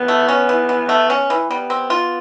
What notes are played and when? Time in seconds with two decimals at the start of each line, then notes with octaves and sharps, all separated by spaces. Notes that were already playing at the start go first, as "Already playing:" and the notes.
Already playing: B3
0.08 A3
0.28 C#4
0.49 E3
0.69 E3
0.89 A3
1.10 C#4
1.30 E3
1.50 G3 B3
1.70 C4
1.90 F4